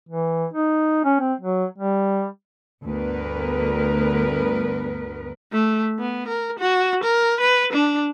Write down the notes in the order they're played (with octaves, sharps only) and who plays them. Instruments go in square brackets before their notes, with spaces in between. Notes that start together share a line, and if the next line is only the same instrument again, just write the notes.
[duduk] E3
D#4
C#4
C4
F#3
G3
[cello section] D2 G2 B3 A#4 B4
[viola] A3
B3
A#4
F#4
A#4
B4
D4